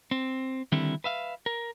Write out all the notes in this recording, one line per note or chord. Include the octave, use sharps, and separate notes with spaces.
C4
D3 D#3 G3 C4 E4 A4
B4 E5 F5
A#4